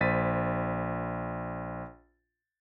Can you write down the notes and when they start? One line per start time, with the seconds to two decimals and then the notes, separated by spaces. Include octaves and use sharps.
0.01 A#1 C5 A6 B6 D#7